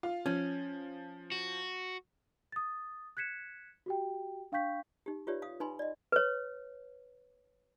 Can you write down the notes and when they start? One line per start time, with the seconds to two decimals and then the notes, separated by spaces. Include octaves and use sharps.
0.03 F4
0.26 F3 C#4
1.32 F#4
2.52 D#6 A6
3.17 F#6 G#6 B6 C#7 E7
3.86 F#4 G4 G5
4.52 D4 F5 G5 C#6 G6 B6
5.06 D#4 G4
5.27 F4 G4 B4 C#5 D5 E5
5.42 F5 D#6
5.60 D#4 B4 G#5 B5 C6
5.79 D5 D#5
6.12 B4 C#5